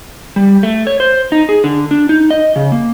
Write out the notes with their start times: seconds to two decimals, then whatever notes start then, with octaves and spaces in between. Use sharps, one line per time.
0.36 G3
0.63 A3
0.87 C#5
1.00 C5
1.32 D#4
1.49 G#4
1.64 D3
1.91 D4
2.09 D#4
2.31 D#5
2.56 C#3
2.72 A#3